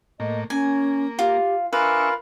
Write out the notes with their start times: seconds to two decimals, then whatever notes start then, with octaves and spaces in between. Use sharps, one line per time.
0.20 A2 A#3 D#5
0.50 A#3 C#4 G#5
1.19 F4 G4
1.73 D4 F4 A#4 B4 E5 F5 G#5 C#6